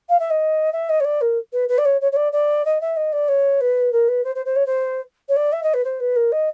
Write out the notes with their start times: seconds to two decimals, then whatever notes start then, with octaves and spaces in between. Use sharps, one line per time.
0.09 F5
0.19 E5
0.30 D#5
0.73 E5
0.89 D#5
1.00 C#5
1.04 D5
1.21 A#4
1.53 B4
1.69 B4
1.78 D5
1.85 C#5
2.01 C#5
2.12 C#5
2.16 D5
2.32 D5
2.65 D#5
2.81 E5
2.96 D#5
3.12 D5
3.28 C#5
3.61 B4
3.92 A#4
4.08 B4
4.24 C5
4.35 C5
4.45 C5
4.56 C#5
4.66 C5
5.29 C#5
5.36 D5
5.52 E5
5.63 D#5
5.74 B4
5.84 C5
6.00 B4
6.16 A#4
6.32 D#5